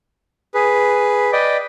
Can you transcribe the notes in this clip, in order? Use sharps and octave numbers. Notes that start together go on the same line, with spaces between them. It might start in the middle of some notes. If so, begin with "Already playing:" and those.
G#4 B4
B4 D5 D#5 G5